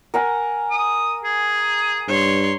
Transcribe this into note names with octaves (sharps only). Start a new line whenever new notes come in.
A#4 F#5 G#5
D#6
G#4
G2 C#5 C6